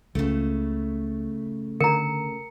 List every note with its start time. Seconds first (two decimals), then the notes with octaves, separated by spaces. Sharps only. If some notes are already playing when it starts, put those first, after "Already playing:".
0.15 C#2 C#3 A3
1.81 D3 A#4 A#5 C#7